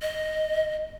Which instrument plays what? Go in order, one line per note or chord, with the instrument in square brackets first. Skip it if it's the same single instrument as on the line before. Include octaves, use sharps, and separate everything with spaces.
[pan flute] D#5